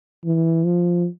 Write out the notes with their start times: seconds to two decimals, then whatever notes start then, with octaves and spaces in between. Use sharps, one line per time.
0.25 E3
0.65 F3